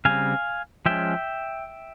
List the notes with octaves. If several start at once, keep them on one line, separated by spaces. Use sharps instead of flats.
C#3 G3 C4 F5 G#5
F3 G#3 C#4 E5 G5